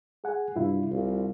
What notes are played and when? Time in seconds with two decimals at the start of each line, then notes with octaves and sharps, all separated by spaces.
0.24 G#4 F#5 G#5
0.56 G2 C3 E4 F4
0.91 C2 F4